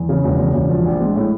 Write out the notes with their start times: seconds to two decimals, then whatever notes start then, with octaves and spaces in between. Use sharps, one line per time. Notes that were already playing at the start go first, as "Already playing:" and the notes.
Already playing: E2
0.09 C#3
0.24 E1
0.39 C#3
0.54 E1
0.69 F3
0.85 A#1
1.01 G#3
1.16 A2